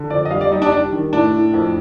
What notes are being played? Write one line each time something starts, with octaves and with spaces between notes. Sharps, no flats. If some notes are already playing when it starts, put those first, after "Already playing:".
Already playing: D3
F2 D5
D#5
G3 F5
D5
G3 D#4
D4
G3 D4
D#3
A2 D4
A2
F2